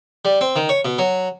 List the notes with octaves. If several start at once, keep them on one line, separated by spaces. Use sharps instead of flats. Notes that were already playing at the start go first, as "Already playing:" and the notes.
G3
C4
D#3
C#5
B2
F#3